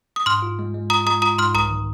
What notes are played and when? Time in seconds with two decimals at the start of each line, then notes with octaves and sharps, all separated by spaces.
0.16 D#6
0.26 G#2 C6 F6
0.42 F4
0.59 G#3
0.74 G#3
0.90 F4 A#5 D#6
1.06 G#3 A#5 D#6
1.22 F4 A#5 D#6
1.38 G#2 C6 F6
1.54 C2 A#5 D#6
1.71 D#3